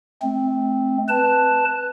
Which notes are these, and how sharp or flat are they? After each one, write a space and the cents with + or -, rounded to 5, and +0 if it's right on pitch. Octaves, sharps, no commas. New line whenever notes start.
A3 -30 C4 +0
B4 +0 A5 +0